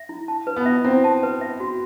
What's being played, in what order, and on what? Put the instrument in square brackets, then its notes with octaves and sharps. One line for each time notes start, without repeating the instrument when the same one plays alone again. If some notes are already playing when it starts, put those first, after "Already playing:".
Already playing: [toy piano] E5
E4
A5
B4
[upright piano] B3
[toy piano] E5
[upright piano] C4 [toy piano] E4
[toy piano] A5
B4
E5
F#4